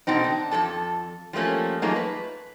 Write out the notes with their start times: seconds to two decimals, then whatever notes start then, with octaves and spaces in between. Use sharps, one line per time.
0.07 B2 D3 C4 D#4
0.24 D4
0.51 F2 F3 A4 A5
1.33 F3 G3 A3 A#3 C#4
1.82 F#3 A3 A#3 D#4 F4 G#4
1.96 B4